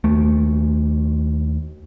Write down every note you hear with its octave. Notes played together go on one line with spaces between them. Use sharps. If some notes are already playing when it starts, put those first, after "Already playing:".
D#2 A3